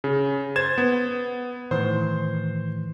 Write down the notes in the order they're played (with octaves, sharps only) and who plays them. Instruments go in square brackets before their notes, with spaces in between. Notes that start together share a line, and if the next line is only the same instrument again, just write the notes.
[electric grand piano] C#3
[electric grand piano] C5 G#6 E7 [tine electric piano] A6
[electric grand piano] B3
[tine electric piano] A2 D#3 E3 [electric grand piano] C5 C6